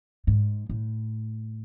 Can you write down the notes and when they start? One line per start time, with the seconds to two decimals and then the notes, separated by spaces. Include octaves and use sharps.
0.27 G#2
0.69 A2